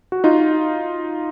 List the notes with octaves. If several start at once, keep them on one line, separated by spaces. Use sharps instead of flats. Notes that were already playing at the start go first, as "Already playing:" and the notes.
F#4
D#4 F4